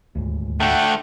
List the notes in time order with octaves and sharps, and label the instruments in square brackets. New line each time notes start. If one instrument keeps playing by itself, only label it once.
[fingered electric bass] D#1 D2 G#2
[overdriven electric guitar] D3 A3 [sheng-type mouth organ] F#5 G5